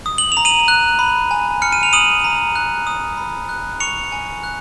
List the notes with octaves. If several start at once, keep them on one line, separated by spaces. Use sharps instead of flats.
D#6
F#7
F7
A#5
D#7 F#7
F#6
B5
G#5
F6 C#7
D#7
F7
D#6 D#7 F#7
A#5
F#6
D#6
B5
F#6
C#6 C#7 F7
G#5
F#6